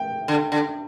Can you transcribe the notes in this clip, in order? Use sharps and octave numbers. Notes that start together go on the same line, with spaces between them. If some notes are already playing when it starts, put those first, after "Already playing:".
Already playing: G5
D3
D3